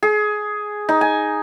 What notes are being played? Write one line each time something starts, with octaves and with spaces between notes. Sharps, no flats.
G#4
D#4
G#5